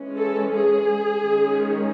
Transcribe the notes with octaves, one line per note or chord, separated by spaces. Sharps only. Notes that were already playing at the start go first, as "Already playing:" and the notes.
Already playing: E3 G#3 C#4
A4
G#4
D#3 G#3 C#4